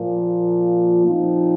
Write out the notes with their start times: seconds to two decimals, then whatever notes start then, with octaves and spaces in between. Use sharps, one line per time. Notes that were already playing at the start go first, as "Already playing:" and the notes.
Already playing: A#2 F3 A#3 F4
1.04 A#2 F3 C4 D#4